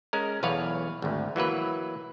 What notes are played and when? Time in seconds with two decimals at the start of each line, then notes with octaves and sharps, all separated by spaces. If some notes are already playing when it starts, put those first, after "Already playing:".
0.13 G#3 C#4 A#4
0.43 B1 E2 B4 C#5 F5
1.02 G#1 D2
1.36 E3 F#3 A#3 B4